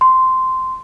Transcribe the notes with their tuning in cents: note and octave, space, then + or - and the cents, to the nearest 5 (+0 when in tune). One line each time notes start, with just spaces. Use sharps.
C6 -10